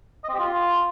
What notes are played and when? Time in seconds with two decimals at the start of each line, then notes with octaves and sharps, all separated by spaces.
0.24 D#5
0.29 C4
0.34 G4
0.39 F4